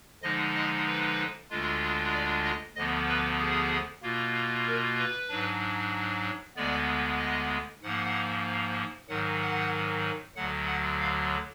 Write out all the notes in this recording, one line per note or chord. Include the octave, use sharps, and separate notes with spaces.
D3 F3 G#3 D#4 D#5
D#5
B4
D2 D3 G#3 D4 F4
D5
D#5
D2 D3 F3 B3 D#5
B4
G#4
B2 A#3 F4
A#4
B4
G#2 F#3 D4
D2 D3 G#3 B3 D5
D#5
G#2 F3 A#3 F#5
G#2 D#3 F#3 F#5
F#5
D2 D3 F#3 F#5
F#5
F5